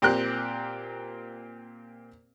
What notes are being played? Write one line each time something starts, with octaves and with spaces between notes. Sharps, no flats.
A#2 C4 G4 A#4 F#6